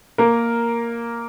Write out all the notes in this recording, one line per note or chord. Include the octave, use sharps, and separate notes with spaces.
A#3 A#4